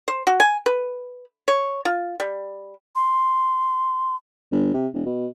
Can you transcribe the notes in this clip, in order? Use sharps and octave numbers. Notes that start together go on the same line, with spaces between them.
C5
F#4
G#5
B4
C#5
F4
G3
C6
G1
C3
E1
B2